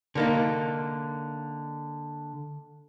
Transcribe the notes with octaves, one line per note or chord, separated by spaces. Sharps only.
D3 A#3 D#4